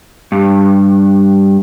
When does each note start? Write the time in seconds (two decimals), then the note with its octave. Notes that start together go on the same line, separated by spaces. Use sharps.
0.32 G2